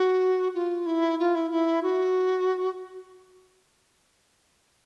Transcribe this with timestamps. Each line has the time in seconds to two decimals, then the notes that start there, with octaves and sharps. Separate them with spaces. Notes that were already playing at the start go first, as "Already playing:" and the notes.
Already playing: F#4
0.54 F4
0.86 E4
1.19 F4
1.35 E4
1.51 E4
1.83 F#4